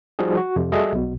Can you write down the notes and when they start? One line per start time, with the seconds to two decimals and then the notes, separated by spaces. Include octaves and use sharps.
0.19 F3 G3 D#4 F#4 G#4
0.37 F#4
0.56 F2 C3
0.72 G3 F#4 G#4 A4 D#5 E5
0.92 B1 B2